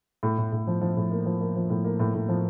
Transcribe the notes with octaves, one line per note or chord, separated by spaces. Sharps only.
A2
A2
A2
F3
F3
A2
A#3
F3
A#3
F3
A2
A#3
A2
A2
F3